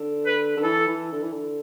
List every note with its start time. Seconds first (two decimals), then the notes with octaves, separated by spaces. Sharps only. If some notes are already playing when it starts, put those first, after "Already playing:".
Already playing: D3
0.26 B4
0.57 D3
0.63 E3 A4
0.87 E3
1.12 D3
1.22 E3
1.33 D3